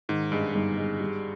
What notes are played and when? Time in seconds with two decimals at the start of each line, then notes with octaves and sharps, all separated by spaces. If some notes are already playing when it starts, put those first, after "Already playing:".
0.09 G#2 D#3
0.32 G2 G#3
0.55 G1 G#2
0.77 G#3
1.00 G3